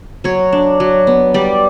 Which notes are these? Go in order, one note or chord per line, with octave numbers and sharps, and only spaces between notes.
F#3 C#5
D4
F#3
B3
G3 D5